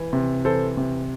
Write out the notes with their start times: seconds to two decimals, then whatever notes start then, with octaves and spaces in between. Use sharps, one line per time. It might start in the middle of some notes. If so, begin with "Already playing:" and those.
Already playing: E3
0.13 C3
0.45 E3 A4 C5
0.77 C3